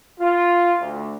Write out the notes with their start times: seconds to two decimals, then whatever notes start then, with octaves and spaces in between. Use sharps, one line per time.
0.20 F4
0.79 D2